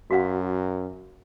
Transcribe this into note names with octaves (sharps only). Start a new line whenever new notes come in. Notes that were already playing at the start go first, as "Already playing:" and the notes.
F#2 F#4 F5 F#5